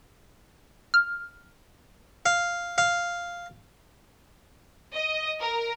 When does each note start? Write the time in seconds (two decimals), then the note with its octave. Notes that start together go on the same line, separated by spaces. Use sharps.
0.94 F6
2.26 F5
2.78 F5
4.94 D#5
5.39 A#4